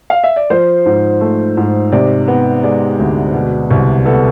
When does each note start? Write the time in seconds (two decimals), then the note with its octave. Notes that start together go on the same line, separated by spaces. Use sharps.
0.10 F5
0.24 E5
0.36 D5
0.50 F3 C5
0.86 G#2
1.21 A3
1.57 G#2
1.92 C3 D5
2.28 B3
2.63 G#3 D5
2.99 D2
3.34 B2
3.71 C2
4.05 B3 A4